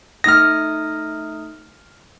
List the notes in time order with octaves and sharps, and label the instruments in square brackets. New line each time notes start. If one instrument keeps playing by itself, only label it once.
[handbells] A3 D#4 D#6 [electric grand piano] F6 A#6